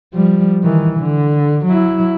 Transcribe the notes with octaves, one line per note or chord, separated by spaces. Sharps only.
F3 G3
D#3 E3
D3
F#3 E4